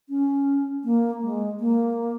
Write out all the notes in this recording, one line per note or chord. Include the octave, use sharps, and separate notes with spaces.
C#4
A#3
G#3
A#3